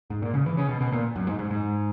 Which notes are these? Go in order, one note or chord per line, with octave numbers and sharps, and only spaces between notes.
G#2
A#2
C#3
E3
C#3
B2
B2
A#2
F#2
G#2
G#2
G#2